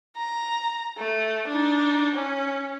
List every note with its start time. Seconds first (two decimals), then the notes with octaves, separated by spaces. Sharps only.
0.17 A#5
0.98 A3
1.48 D4 D#4
2.15 C#4